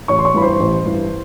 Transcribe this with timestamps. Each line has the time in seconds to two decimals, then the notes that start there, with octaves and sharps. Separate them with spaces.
0.08 A1 C#5 C#6
0.19 C6
0.25 C#5 C#6
0.34 G2 E3 B5
0.42 C5 C6
0.59 A1
0.85 G2 E3